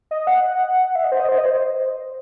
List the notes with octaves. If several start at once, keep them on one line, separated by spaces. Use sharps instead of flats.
D#5
F#5
E5
D#5
C5
D#5
C5
D#5
C5